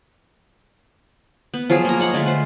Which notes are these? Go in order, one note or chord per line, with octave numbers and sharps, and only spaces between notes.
B3
F3 F#3 F4 G#4
A#3 A#5
C#5 D#5 F#5 A#5
D3 G#3 A3 F4
B4 C5